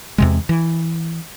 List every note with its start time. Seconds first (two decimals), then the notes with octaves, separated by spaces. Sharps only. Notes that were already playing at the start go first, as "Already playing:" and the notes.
0.18 E2 C3 G#3
0.49 E3